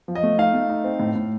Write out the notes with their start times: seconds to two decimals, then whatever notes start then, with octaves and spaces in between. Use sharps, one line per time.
0.08 F3
0.15 D#5
0.23 A3
0.38 D#4 F5
0.54 A3
0.69 D#4
0.84 C4
1.00 A2
1.16 A2